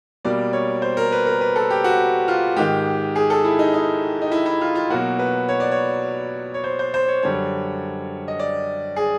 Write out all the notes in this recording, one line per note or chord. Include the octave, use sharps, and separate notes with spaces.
B2 G3 A#3 D5
C#5
C5
A#4
B4
A#4
B4
A4
G4
F#4
F4
G#2 D#3 G#3 G4
G#4
A4
E4
D#4
D#4
D#4
E4
E4
F4
F4
B2 F#3 A#3 F#4
B4
C#5
D5
C#5
C#5
C5
C5
C5
C#5
F#2 D3 G3 C#5
D#5
D5
G#4